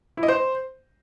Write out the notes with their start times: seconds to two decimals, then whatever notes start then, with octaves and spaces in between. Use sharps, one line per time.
0.17 E4
0.23 D#5
0.28 C5